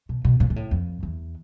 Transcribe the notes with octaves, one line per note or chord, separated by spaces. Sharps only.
B2
B2
A#2
A#2
A2
F2
E2